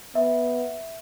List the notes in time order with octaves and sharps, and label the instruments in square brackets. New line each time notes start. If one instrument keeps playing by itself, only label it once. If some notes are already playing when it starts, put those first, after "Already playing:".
[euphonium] B3 [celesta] E5